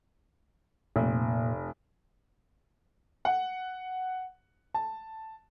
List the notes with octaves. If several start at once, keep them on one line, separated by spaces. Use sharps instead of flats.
F1 A#2 A#3
F#5
A5